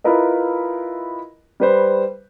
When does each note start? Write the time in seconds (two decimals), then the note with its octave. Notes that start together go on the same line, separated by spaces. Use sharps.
0.04 E4 F4 A#4 B4 D#5
1.60 G3 B4 C5